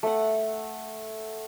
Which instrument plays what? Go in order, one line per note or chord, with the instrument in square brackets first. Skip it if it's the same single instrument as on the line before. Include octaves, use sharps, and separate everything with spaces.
[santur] A3 F#5